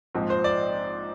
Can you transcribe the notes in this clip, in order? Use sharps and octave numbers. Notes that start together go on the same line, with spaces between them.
A#1 G#2 F3 C4
C5
D5